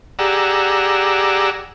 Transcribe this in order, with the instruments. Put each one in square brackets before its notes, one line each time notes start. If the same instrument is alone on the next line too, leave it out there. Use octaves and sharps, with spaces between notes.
[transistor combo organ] G4 G#4 D5 F#5 A#5 E6